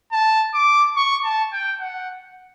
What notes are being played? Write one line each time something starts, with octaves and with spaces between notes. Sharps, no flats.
A5
D6
C#6
A5
G5
F#5